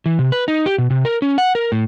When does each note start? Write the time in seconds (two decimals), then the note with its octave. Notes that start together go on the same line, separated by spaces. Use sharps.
0.06 E3
0.19 C3
0.32 B4
0.48 D#4
0.66 G4
0.78 B2
0.90 C3
1.05 A#4
1.22 C#4
1.38 F#5
1.55 A#4
1.72 A2